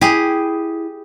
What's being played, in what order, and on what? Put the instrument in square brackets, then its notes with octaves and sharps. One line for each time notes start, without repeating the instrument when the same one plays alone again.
[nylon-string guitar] E4 [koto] G4 G#4